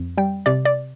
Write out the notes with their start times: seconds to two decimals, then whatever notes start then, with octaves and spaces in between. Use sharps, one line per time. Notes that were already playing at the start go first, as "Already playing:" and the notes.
Already playing: F2
0.17 G3 G5
0.46 C3 D5
0.65 D5